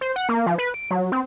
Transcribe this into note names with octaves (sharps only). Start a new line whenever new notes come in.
C5
F#5
A#3
F3
B4
D7
F#3
C4